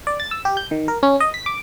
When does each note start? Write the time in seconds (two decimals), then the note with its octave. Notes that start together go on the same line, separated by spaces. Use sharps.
0.07 D5
0.20 A6
0.31 E6
0.45 G4
0.57 G6
0.71 D#3
0.88 A#4
1.03 C#4
1.20 D#5
1.34 B6
1.46 D6